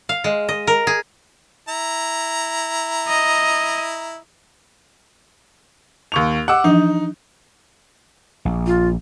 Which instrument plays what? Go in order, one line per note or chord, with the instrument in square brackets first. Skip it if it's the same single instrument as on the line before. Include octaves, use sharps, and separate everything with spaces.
[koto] F5
G#3
D#5
A#4
G#4
[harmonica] E4 A#5
[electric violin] D#5
[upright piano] D#2 C#6 F7
[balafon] G4 D#5 C#6 [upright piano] F#5 D6 E6
[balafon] E3 F3 D4 [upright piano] D#4
[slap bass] A#1
[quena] F4